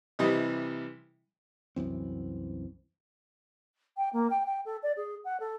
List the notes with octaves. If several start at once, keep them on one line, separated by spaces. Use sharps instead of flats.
C3 E3 G3 D#5
C2 F#2 E3 C4
G5
A#3
G5
G5
A4
D5
G#4
F#5
A4